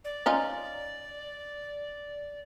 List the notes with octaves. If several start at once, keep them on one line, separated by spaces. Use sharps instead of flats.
D5
C#4 D#4 F4